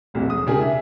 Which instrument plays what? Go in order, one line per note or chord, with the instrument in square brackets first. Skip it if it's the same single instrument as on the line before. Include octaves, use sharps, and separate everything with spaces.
[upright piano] E1 C2 F2 A#2
E1 D#6
C#3 G#3 D4 G4 G#4 A#4
E5